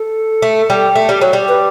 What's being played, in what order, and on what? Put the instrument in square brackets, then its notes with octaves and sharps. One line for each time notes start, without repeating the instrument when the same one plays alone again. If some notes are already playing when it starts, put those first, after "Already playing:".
Already playing: [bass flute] A4
[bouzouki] A3
G3
A3
G3
F#3
G3
[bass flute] B4